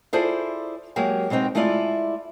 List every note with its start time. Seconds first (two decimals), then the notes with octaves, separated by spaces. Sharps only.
0.13 E4 F4 G#4 A4 C5 D5
0.96 F#3 G#3 A#3 G4 G#4
1.30 B2 G#3 C4 D#4 G5
1.55 G#3 A3 E4 F4 D5